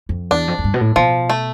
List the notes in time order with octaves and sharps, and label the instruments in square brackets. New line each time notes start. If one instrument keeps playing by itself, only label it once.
[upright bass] F2
[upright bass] E2 [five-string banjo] D4
[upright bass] F2
F2
G2
B2
A2
[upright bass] B2 [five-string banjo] F3
[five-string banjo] A3